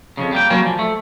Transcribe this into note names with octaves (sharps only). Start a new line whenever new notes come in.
F2 A2 C#3
G3 A#3 G5
F#3 G3 A#3 C#4
F3
A3